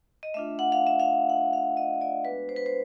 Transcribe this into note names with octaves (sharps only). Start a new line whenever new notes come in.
D#5
A3 D4 F4 E5
F#5
F5
E5
F5
F#5
F5
D#5
D#5
D5
G#3 B3 D4 F#4 B4
C5
B4
C5